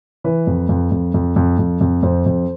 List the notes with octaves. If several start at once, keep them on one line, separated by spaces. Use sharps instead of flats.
E3 B4
F2
F2
F2
F2
F2
F2
F2
F2 C5
F2